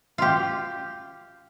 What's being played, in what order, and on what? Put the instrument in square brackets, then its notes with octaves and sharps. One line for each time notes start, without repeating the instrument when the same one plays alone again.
[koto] F4 G4